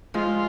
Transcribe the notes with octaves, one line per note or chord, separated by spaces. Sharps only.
F3 G#3 F4